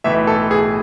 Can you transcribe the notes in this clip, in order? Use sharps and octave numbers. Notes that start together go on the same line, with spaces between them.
B1 A2 E3 E5
A4
G#4